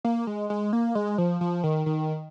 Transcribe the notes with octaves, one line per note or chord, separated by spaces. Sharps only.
A#3
G#3
G#3
A#3
G#3
F3
F3
D#3
D#3